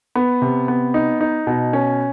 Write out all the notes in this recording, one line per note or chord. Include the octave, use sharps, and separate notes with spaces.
B3
C3
B3
D#4
D#4
B2
C#4